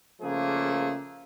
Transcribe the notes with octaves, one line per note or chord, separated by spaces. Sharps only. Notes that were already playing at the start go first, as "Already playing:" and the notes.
C#3 F3 A3 A#3 G#4